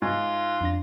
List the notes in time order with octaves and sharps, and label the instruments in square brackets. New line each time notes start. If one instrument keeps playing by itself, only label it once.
[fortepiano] G#2 [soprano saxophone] F4
[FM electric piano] F2 D4 A#6